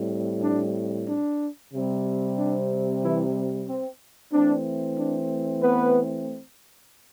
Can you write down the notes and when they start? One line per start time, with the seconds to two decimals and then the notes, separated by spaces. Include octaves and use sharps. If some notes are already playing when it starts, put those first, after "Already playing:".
Already playing: A2 G3 C4
0.43 D4
1.08 D4
1.73 C3 G3 C4
2.38 D4
3.03 E3 E4
3.68 C4
4.33 E3 A3 C4 D4
4.98 D4
5.62 B3 B4